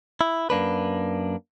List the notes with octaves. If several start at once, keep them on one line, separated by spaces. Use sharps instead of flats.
E4
F#2 A#3 D4 B4